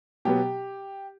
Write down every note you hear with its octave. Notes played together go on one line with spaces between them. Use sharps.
B2 F#3 B3 G4